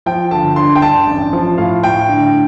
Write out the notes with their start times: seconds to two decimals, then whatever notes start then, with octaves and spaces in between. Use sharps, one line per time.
0.06 F3 G5
0.31 G1 A5
0.56 G2 C6
0.76 G5
0.82 G2 A5
1.07 A1
1.33 F3
1.58 A2 F5
1.83 A2 G5
2.09 D3